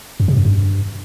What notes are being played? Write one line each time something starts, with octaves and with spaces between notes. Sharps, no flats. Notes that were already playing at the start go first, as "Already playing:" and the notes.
F#2
C3
F#2
G2